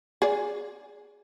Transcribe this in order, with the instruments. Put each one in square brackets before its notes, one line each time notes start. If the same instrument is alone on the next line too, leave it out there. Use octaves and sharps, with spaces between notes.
[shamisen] G#4 D5